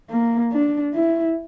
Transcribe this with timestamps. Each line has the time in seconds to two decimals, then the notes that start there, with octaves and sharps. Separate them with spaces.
0.11 A#3
0.52 D4
0.94 E4